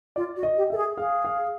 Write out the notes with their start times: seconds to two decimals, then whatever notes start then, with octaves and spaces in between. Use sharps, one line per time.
0.16 F4 D5
0.36 F#4
0.43 D#5
0.57 G4
0.70 A4 E5
0.77 G#4
0.97 G#4 F5
1.25 F5